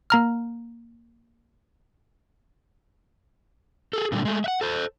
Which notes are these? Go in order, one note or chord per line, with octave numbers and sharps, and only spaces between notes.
A#3 A#5 F6
G#4 A4
A#2 D3 G3
G#3 A3
E5 F#5
A4 C5